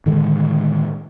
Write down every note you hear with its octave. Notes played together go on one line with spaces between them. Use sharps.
A2 D3 D#3 G#3